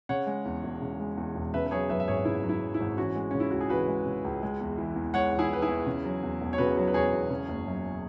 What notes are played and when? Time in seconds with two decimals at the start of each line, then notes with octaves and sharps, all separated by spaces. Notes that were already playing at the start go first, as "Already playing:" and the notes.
0.09 C#3 C#5 F#5
0.27 G#3
0.45 E2
0.64 E1
0.82 C#3
1.00 G#3
1.17 E2
1.35 E1
1.54 C#3 B4 E5
1.66 B4
1.71 F#3 G#4 C#5
1.89 F#2 B4 E5
2.00 E5
2.07 G#1 G#4 C#5
2.25 C#3 E4
2.43 F#3
2.49 E4
2.62 F#2
2.74 E4
2.80 G#1
2.97 E3 C#4 F#4
3.16 G#3
3.31 C#3 C#4
3.40 E4
3.51 C#2 F#4
3.61 G#4
3.69 E3 F#4 B4
3.88 G#3
4.06 C#3
4.25 C#2
4.43 G#3
4.60 E2
4.78 E3
4.96 E2
5.14 G#3 C#5 F#5
5.32 E2
5.39 E4 G#4
5.50 E3 B4
5.62 E4 G#4
5.68 E2
5.86 C#3
6.05 F#3
6.23 E2
6.41 E1
6.53 C#5
6.58 C#3 F#4 B4
6.77 F#3
6.88 B4
6.94 E2 G#4 C#5
7.13 E1
7.30 C#3
7.48 F#1
7.67 F#2